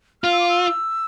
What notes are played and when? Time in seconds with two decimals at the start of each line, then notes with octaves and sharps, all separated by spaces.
0.23 F4 F6
0.32 E6
0.40 D6
0.49 E6